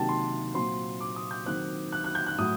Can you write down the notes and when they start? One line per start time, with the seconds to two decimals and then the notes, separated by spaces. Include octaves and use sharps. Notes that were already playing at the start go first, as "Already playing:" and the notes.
Already playing: C3 D#3 F#3 A#3 G5 A5
0.09 C6
0.54 A#2 F#3 C4 C6
1.01 D6
1.16 D#6
1.31 G6
1.46 D#3 F#3 C4 F#6
1.92 F#6
2.04 F#6
2.15 G6
2.26 F#6
2.38 A2 F#3 D#6